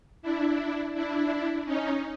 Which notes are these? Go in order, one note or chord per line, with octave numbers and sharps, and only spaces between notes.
D4 E4
D4 E4
C#4 D#4